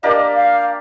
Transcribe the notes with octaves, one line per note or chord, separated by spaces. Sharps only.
A#3 D4 G4 A#4 D#5
F5